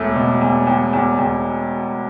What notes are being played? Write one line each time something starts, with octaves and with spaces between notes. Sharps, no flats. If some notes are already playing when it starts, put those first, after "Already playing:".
Already playing: E1 E2 A3
B2
E2
E2
E2
E2